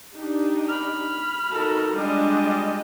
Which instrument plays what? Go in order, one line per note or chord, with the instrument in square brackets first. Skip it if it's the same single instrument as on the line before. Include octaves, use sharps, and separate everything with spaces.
[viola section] D4 D#4 G4
[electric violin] B5 F6
[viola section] D#4 F#4 [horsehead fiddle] A4 A#4
[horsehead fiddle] G3 G#3 [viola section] D4 F4 D#5